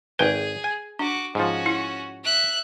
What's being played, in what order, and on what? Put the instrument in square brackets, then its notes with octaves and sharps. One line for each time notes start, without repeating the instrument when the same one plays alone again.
[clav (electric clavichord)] G#1 G5 G#5 [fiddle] G#4 [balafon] B4
[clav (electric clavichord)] G#5
[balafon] D4 [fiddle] F#4 D6
[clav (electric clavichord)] G#2 F3 [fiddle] C#4 F#4
[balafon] E4
[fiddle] E5 F#6